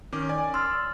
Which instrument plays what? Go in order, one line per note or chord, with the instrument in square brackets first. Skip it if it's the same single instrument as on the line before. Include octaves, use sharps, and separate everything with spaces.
[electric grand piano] D#3 C#4 D6
D5 G#5
[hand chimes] C6 F6 A6 [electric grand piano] E6